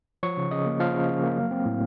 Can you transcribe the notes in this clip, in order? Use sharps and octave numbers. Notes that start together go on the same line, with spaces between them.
F3 C#5 C#6
C#3
C#3 D#5 D#6
A#3
F3 F5 F6
C#3
C#3
A#3
F#3
C4
A2